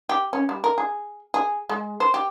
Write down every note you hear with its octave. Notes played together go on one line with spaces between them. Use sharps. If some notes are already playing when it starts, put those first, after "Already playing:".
G4
C#4
G3
A#4
G#4
G#4
G#3
C5
G4